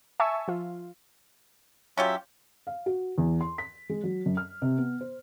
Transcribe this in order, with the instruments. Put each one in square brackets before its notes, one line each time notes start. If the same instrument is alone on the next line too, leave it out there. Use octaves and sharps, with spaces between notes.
[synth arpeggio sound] E5 G#5 A5 C#6 E6
F3 F4
[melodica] F#3 E5 [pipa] C#4 F4 G4
[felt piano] F5
F#4
E2
C6
B6
G#3
F#3
F#2
F6
C3
B3
C5